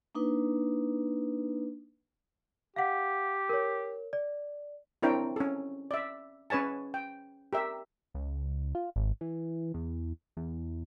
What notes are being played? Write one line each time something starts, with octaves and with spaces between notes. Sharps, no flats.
A#3 D4 D#4 B4
G4 F5 F#5
A#4 C#5
D5
C4 D4 E4 A#4 C#5 G5
C#4 A4
D5 E5
C#4 B4 C#5 G#5 A5
G5
G4 A#4 E5
C#2
F4
G#1
E3
E2
E2